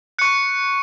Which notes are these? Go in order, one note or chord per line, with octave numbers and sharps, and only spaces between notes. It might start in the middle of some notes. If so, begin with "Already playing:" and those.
C#6 F#6 C#7